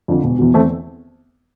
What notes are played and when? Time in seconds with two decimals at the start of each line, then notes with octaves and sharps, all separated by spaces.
0.08 F2 D3 F3
0.24 E1
0.39 E2 B2
0.54 E2 A3 C4